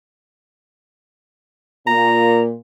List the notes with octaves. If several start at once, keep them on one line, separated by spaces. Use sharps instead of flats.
A#2 A#5